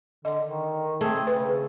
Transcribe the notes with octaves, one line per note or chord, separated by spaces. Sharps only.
D3 D#5
D#3
A3 C4 G#4
C#3 B4